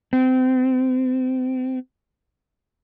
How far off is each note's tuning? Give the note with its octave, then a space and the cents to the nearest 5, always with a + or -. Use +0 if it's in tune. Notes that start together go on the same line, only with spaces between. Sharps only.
C4 -30